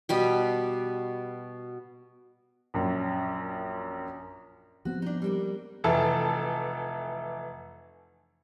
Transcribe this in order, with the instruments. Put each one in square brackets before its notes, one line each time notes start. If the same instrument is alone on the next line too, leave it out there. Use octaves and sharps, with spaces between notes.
[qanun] B2 G3 G4
[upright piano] A#1 F#2
[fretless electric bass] F3 B3 C4 [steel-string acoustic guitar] F#4
[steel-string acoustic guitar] D4 D#4
G3 A#3 A#4
[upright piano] F1 E3 A4 A5